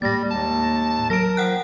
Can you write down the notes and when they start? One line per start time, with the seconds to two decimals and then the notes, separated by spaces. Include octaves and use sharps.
0.02 A2 G3 G#3 A#3 A6 A#6
0.31 D#2 A5
1.10 F#3 A#4 A#6 D7
1.37 F3 F#5 G5 F#6